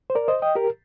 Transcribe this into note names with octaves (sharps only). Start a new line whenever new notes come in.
C5
A#4 D5
C5 D#5
D#5 G5
G4 A#4